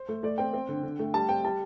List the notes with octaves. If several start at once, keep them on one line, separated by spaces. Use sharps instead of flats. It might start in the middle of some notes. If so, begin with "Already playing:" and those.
Already playing: C5
A3
A3 D5
C4 G5
C4
D3
D3
A3
G3 A5
C4 G5
G3 A5